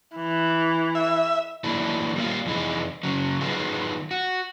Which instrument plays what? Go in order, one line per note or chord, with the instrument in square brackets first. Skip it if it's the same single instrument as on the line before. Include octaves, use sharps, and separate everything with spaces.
[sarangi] E3
[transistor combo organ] E5
[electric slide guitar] E3 F#3 A3 A#3 D4 E4
G3 A#3 F4
F2 C3 E3 C#4 D#4 G#4
C#3 F#3
D#3 F#3 B3 F4 G#4
F#4